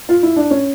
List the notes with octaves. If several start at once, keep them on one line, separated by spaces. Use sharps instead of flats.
F4
E4
D4
C#4